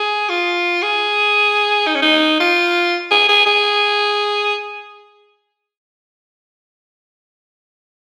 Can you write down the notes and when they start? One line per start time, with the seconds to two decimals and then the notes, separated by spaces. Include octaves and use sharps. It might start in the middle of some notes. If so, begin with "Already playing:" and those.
Already playing: G#4
0.29 F4
0.82 G#4
1.87 D#4
1.95 C#4
2.02 D#4
2.40 F4
3.11 G#4
3.29 G#4
3.46 G#4